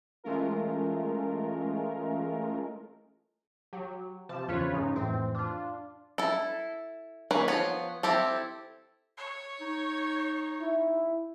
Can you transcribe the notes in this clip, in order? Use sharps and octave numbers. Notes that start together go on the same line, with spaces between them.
E3 G#3 A3 C#4 F4 A#4
F#3 G4
C3 F3 A5
E2 C#3 F3 F4 B4 C#5
G#2 C#3 C#4 D#4
F2 A2 E3 C4
D4 F4
E4 A4
D#3 A#3 C#4 B4
F3 B3 C#5
C4 E4 G4 A4
C#5
D#4
E4